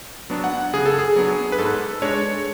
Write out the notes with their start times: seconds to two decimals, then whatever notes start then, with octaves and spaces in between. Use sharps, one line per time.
0.30 F#3 B3 D4
0.44 F#5
0.73 C#3 G#4
0.86 A4
0.99 G#4
1.16 F#3 B3 D4
1.52 B4
1.59 G#2 A4
2.02 G#3 D4 C#5